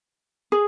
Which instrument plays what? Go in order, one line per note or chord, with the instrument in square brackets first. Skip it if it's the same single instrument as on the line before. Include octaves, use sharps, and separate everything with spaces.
[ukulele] G#4